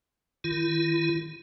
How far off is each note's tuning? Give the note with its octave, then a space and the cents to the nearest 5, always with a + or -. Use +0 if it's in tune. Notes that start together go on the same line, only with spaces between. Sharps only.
D#3 +0 E4 +40